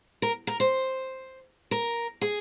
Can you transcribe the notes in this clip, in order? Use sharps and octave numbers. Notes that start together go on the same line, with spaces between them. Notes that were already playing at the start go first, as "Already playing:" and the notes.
A#4
A#4
C5
A#4
G#4